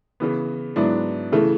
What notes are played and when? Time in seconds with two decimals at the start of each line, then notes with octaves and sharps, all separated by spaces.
0.20 C#3 E3 B3
0.76 G#2 F#3 B3 D4 E4
1.32 C#3 E3 A3 E4